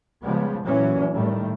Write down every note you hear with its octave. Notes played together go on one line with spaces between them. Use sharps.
C#3 F3 G3 G#3 B3
A#2 E3 F#3 C#4
A2 D#3 G3 A3